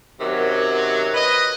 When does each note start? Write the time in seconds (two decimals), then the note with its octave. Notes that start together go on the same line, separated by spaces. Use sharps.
0.21 F#2 C3 D#3 F#3
1.14 B4 D#5